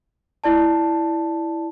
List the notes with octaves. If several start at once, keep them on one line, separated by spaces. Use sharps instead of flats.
E4 D5 A5